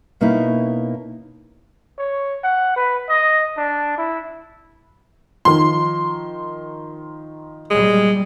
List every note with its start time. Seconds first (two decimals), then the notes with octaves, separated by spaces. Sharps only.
0.21 B2 A#3 C#4 D#4 E4
1.98 C#5
2.44 F#5
2.76 B4
3.09 D#5
3.57 D4
3.98 E4
5.45 D#3 F3 C6
7.70 A#2 G3 G#3